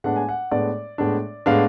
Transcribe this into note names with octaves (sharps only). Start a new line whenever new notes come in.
A2 G#3 B3 D4 F#5
G#5
F#5
A2 G#3 B3 D4 D5
A2 G#3 B3 D4
A2 G#3 B3 D4 F5